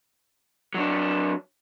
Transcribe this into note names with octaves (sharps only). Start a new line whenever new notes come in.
F#3 D4